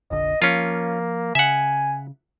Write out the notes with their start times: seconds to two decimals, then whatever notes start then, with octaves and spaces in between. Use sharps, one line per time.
0.11 F1 A#1 D3 D#5
0.42 F3 A#3 C#4 F4
1.35 C#3 E5 F#5 G#5